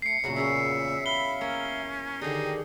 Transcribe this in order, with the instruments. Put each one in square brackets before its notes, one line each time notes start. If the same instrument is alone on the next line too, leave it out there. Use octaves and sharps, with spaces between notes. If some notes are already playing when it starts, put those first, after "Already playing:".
[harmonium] A3 [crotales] C7 C#7
[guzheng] E2 F#3 F#5 [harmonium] A#2 C#3
[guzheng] C#4 G#4 F#5 [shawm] E5
[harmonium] E5 F5 [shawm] B5 [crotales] G7
[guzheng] A#3 [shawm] C#4
[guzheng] D3 G#4 [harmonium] D#3 G4 D5 [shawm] D#4